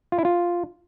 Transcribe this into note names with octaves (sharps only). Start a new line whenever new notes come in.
F4
E4
F4